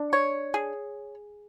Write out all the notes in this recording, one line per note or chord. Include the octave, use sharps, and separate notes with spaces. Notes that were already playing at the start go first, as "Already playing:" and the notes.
Already playing: D4
C#5
G#4